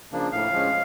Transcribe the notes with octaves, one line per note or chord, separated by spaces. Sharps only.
C#3 F3 A#3 D4
A2 F5
F3 G#3 C#4